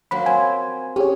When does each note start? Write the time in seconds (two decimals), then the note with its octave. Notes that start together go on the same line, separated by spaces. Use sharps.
0.11 F3 F#3 A#3 B5
0.26 C4 G#5
0.96 C#4 G4 G#4 C#5